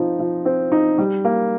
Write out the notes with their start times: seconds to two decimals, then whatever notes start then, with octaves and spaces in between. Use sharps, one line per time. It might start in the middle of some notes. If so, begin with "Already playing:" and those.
Already playing: F3 C4 D#4
0.19 F3
0.45 C4
0.72 D#4
0.98 G3
1.25 A#3